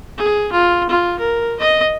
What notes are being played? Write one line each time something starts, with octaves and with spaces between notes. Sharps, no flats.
G#4
F4
F4
A#4
D#5